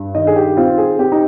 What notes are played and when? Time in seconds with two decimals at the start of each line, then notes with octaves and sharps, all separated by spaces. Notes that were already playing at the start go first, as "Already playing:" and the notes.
Already playing: G2
0.15 D#3 D#5
0.27 G#4
0.36 G4
0.57 C4 F4
0.78 G#4
0.99 C4 G4
1.12 D#4